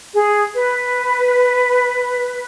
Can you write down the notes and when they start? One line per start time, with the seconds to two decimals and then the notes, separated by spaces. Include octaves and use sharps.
0.13 G#4
0.54 B4